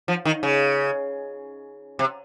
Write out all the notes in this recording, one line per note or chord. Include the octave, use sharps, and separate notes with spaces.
F3
D#3
C#3
C3